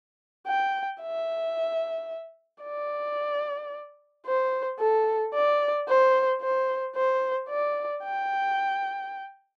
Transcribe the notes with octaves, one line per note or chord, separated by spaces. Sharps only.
G5
E5
D5
C5
A4
D5
C5
C5
C5
D5
G5